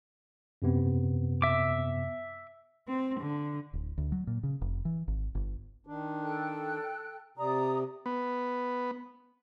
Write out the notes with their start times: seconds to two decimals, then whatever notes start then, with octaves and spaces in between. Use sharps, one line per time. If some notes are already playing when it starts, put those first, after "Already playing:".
0.62 F#2 C3 B3
1.42 E5 D6
2.88 C4
3.20 D3
3.73 D1
3.98 D2
4.12 F#3
4.27 A#2
4.43 C#3
4.61 F1
4.85 E3
5.08 G#1
5.35 G1
5.87 D#3 D4
6.22 A4 G5 F#6
7.38 C3 D5 A#5 D#6
8.06 B3